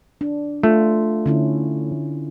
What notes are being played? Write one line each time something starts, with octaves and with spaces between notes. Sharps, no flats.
D4
A3 F4
D3 C#4 E4